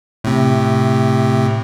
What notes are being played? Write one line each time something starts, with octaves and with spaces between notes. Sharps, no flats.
A2 C3